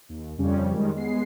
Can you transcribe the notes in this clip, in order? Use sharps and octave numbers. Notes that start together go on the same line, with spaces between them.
D#2
F2 C#3 G3 C#4
D#3 G3 G#3
G#3 B3 C7